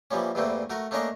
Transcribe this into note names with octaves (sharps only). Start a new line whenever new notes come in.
E3 F3 G3 A#3 C#4
E2 G2 E3 A3 A#3 C4
A3 F#4 A#4
A3 A#3 C#4 D4 A#4 D#5